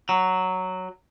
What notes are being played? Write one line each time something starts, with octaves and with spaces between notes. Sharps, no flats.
F#3